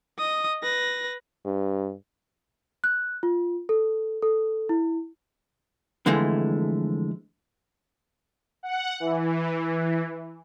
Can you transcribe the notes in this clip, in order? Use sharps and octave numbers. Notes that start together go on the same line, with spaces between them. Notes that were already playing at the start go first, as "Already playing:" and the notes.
D#5 D#6
B4 A#6
G2
F#6
F4
A4
A4
E4
F2 D3 E3 G#3 A3
F#5
E3